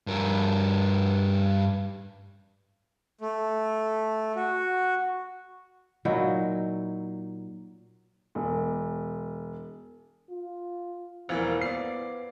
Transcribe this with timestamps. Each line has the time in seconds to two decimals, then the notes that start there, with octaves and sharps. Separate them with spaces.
0.07 G2 A#4
3.21 A3
4.36 F#4
6.05 A#2 F#3 D#4 E4
8.35 E1
10.30 F4
11.29 E1 E3 F3 A#3 C5 F5 G#6
11.61 B3 D5 C7